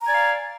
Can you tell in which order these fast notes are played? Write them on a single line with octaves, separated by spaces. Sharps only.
A#5 G#5 D5 F5